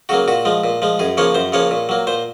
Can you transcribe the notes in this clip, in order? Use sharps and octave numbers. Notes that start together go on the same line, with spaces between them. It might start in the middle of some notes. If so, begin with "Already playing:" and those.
C#3 F#3 A#3 F#4
A#2 F#4
F3 G#3
A#2
F3 G#3
F#2 G#4
C#3 F3 A#3 C#5
F#2 C5
C#3 F3 A#3 C#5
A#2
F#3 A#3
A#2 C5